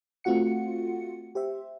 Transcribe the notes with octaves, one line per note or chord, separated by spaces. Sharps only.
A3 C4 F4 F#4 F#5 C#7
G4 C5 E5